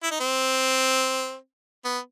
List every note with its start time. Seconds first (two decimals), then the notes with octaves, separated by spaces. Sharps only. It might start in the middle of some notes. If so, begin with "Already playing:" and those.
0.03 E4
0.11 D#4
0.20 C4
1.85 B3